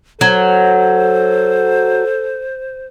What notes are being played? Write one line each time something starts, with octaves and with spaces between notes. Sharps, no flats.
F#3 A4 C5